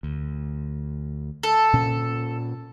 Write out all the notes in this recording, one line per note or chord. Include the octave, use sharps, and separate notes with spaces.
D2
A4
A#2 C#4